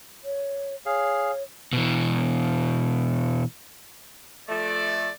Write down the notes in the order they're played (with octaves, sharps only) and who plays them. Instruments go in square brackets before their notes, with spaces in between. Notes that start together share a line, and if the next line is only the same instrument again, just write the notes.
[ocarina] C#5
[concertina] G#4 F5 [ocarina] C#5
[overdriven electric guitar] B2 E3
[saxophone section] F3 A3 [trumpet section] D5